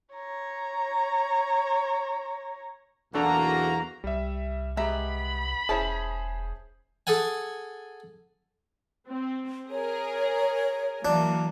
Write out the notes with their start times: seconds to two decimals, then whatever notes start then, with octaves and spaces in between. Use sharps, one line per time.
0.14 C#5 A#5
3.14 B1 E2 A#3 D4 F#4 A4 F#5 A#5
4.04 C2 G3 E5
4.77 G#3 B3 G4 E5 A#5 B5
5.69 E1 C#4 E4 G#4 C5 G#5 A5
7.07 G#4 A4 F#5 G#5
9.08 C4
9.70 G#4 A#4 C#5
11.05 E3 F#3 A#3 D4